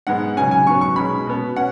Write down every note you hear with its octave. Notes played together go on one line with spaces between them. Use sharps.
G#2 G#3 B3 F#5
C#3 F#3 C#4 G#5
G#5
G#2 F#3 B3 C#6
C#6
B2 G#3 C#4 B5
B2 B3
C#4 F#5